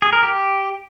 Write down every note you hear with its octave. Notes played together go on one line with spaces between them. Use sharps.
G#4
A#4
G4